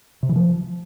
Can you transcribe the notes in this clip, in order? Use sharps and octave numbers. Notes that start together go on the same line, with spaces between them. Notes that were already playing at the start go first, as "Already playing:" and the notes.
C3
E3
F3